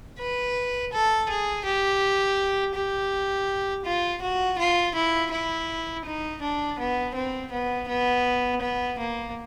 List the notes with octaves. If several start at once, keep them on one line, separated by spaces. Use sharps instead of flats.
B4
A4
G#4
G4
G4
F4
F#4
F4
E4
E4
D#4
D4
B3
C4
B3
B3
B3
A#3